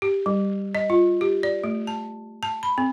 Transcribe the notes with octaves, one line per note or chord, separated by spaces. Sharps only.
G4
G3
D#5
F4
G4
D5
A3
A5
A5
B5
C4